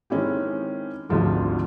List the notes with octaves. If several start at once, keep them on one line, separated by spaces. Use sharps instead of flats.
D#3 G#3 C4 C#4 E4 G4
G#1 D2 G#2 F3 G3